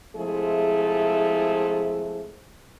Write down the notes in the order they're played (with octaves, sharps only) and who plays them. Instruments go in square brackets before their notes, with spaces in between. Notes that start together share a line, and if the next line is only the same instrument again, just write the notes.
[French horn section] C3 F3 G#3 A3 E4 G#4